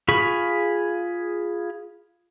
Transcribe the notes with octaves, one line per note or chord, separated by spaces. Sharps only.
F4 G#4 B5 C#6